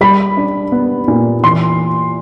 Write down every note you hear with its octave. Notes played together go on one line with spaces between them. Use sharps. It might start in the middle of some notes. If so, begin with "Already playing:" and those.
G3 B5
D4
B3
A#2
E3 C6